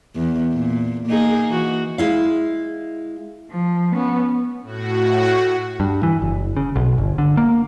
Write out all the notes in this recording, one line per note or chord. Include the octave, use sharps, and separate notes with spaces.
E2
A#2
A#3 D#4 G#4
E3 F#4
G#3 E4 F5
F3
B3 C#4
A2 F#4
G2
E3
F#1
C#3
B1
G1
D3
A#3